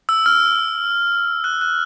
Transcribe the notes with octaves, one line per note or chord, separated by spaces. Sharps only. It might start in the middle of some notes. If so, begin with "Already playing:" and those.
E6
F6
F#6
F#6